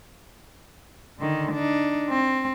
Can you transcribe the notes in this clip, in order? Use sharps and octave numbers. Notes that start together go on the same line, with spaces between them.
D3 D#3
D4 D#4
C4